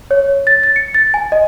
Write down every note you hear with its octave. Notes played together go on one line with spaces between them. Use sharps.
C#5
A6
A6
C#7
A6
G#5
D#5